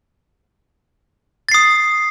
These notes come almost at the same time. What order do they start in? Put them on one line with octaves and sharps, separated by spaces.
A6 C7 D#6